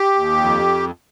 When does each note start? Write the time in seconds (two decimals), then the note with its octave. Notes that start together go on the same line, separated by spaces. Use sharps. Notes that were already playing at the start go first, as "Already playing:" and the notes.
Already playing: G4
0.15 D#2
0.37 F2